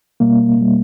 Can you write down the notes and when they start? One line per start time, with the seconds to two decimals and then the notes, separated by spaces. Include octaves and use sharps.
0.20 B2 G3 A#3
0.56 B2 G3